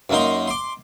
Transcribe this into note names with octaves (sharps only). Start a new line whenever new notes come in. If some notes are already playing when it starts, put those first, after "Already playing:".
F#2 A#3 D#4 C6
C6 D6